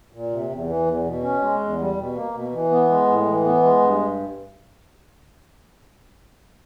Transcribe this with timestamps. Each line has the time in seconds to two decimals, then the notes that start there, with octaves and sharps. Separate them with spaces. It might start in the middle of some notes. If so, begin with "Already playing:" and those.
0.13 A#2
0.31 C3
0.49 E2
0.67 E3
0.86 E2
1.05 B2
1.22 C#4
1.42 G#3
1.60 E2
1.79 G3
1.97 B2
2.15 A#3
2.33 B2
2.52 E3
2.71 B3
2.89 G#3
3.08 A2
3.25 E3
3.44 B3
3.63 G#3
3.81 G2